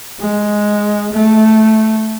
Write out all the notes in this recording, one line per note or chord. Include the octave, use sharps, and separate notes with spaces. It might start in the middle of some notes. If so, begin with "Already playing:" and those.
G#3
A3